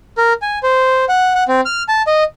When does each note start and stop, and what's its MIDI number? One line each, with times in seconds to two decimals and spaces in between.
0.18 0.33 70
0.42 0.59 80
0.63 1.05 72
1.09 1.34 78
1.35 1.44 78
1.48 1.61 60
1.66 1.83 89
1.89 2.02 81
2.07 2.24 75